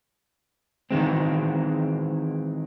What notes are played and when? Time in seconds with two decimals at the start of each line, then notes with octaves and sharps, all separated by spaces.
0.91 D#3 E3 G#3 C4